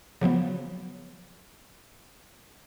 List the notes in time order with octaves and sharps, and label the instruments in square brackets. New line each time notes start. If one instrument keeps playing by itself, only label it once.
[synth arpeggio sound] C#3 F3 F#3 B3